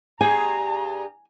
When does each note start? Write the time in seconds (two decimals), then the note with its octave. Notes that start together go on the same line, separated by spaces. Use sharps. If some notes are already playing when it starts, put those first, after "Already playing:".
0.21 G2 G4 G#4 G#5 A#5